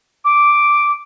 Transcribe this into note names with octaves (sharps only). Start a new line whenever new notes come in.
D6